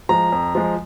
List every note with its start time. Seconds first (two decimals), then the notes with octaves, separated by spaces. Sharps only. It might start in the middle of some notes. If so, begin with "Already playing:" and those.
0.09 F3 G#3 A#5
0.32 F2
0.55 F3 G#3